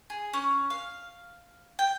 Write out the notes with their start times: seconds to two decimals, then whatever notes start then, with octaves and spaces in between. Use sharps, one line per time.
0.10 G#4
0.33 C#4
0.70 F5
1.79 G5